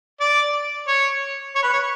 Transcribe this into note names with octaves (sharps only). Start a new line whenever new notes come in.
D5
C#5
C#5
B4
C#5